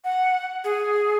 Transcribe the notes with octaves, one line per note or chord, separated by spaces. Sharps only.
F#5
G#4